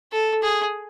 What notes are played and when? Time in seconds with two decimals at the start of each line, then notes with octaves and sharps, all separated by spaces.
0.13 A4
0.43 G#4